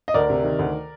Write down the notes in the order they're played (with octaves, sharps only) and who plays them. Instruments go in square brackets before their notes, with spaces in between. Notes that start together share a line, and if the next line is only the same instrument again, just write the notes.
[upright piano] D#5
D2 A#4 D5
C3
D#3
D2